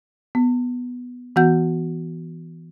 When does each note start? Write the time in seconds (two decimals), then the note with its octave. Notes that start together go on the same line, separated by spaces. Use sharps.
0.35 B3
1.36 E3 B3 F#4 F#5 G6